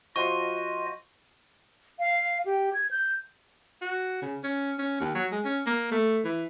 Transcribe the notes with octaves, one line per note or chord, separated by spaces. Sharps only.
F3 F#4 D#5 C6 C#6 D#7
F5
G4
G#6
G6
F#4
C#3
C#4
C#4
D#2
F#3
G#3
C#4
A#3
A3
E3